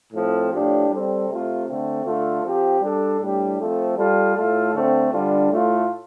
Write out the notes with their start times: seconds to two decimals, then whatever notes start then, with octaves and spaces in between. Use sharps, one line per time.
0.13 A2 F3 C4 A4
0.51 A2 F3 D4 G4
0.90 G3 C4 A4
1.29 C3 A3 F4
1.67 D3 A3 C4
2.05 D3 A3 F4 A4
2.43 F3 C4 G4
2.81 G3 D4 A4
3.20 A2 G3 D4 G4
3.58 F3 A3 C4 A4
3.97 G3 F4 A4
4.35 A2 A3 F4 A4
4.74 D3 A3 C4
5.12 D3 G3 D4 F4
5.50 A2 A3 F4